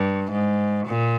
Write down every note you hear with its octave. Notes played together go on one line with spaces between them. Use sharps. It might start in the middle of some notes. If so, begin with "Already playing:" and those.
Already playing: G2
G#2
A#2